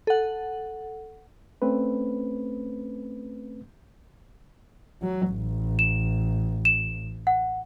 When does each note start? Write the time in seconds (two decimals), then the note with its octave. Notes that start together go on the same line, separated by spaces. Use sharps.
0.07 A4 F#5
1.62 A3 C4 C#4 B4
5.02 F#3
5.32 A1
5.79 E7
6.65 E7
7.27 F#5